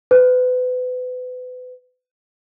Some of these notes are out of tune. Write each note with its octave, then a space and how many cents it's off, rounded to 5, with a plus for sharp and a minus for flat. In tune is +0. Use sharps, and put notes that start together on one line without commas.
B4 +35